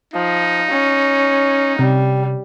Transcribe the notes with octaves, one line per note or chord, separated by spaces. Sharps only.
F3 D#4
C#4
C3 G3